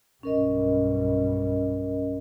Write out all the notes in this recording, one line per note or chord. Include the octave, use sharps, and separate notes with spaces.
B1 G2 C#4 A#4 D#5